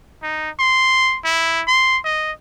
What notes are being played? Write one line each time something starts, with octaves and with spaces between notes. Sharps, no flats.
D#4
C6
E4
C6
D#5